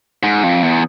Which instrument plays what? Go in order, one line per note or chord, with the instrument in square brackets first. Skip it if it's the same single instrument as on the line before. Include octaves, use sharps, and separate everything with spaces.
[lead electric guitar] G#2
F2
E2